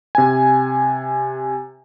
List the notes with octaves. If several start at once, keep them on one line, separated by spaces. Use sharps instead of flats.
C3 G#5